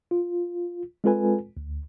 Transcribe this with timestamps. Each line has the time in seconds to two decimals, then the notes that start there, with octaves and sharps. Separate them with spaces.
0.11 F4
1.04 G#3 C4 F4 A4 B4 G#5
1.57 D2